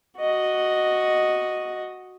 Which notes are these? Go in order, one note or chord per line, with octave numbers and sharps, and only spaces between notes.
F#4 D#5